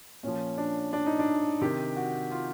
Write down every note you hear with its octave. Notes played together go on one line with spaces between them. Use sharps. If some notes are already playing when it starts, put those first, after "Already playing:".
A#2 F3 C#4
D4
D4
D#4
D4
C3 D#3 G4
F#4
F4